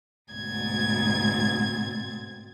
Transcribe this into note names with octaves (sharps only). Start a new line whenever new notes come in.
D2 G#2 B2 C4 G#6 A6